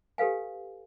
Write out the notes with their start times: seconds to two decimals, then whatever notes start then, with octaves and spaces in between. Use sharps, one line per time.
0.18 G4 A4 B4 F5 G#5